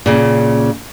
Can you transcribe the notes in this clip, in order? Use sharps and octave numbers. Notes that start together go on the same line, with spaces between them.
A#2 C#3